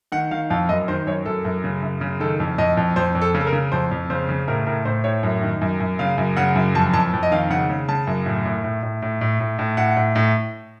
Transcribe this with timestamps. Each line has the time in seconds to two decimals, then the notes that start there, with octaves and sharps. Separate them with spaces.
0.12 D#3 F#5
0.31 D#3 F5
0.50 F2 F5
0.69 F#2 D#5
0.88 D#3 C5
1.07 F#2 C#5
1.26 F#2 A4
1.45 F#2
1.64 C#3
1.82 F#2
2.01 C#3
2.20 D#3 A4
2.40 F2
2.58 F2 D#5
2.77 F2
2.96 F2 C5
3.15 F2
3.22 A4
3.34 C#3
3.41 A4
3.47 A#4
3.53 C#3
3.72 F2 C5
3.91 F2
4.10 C#3 C5
4.29 C#3
4.48 A2 A#4
4.66 A2 A#4
4.85 A2 C5
5.04 A2 C#5
5.23 F#2
5.42 D#3
5.61 F#2
5.80 F#2
5.99 C#3 F5
6.18 F#2
6.37 C#3 F#5
6.55 F#2
6.75 F2 A5
6.93 F2 A5
7.13 F2
7.23 D#5
7.31 D#3 F5
7.50 C#3 F#5
7.70 C#3
7.89 C#3 A5
8.07 F#2
8.26 A2
8.45 A2
8.64 A2
8.83 A2
9.02 A2
9.21 A2
9.40 A2
9.59 A2
9.77 A2 F#5
9.96 A2
10.15 A2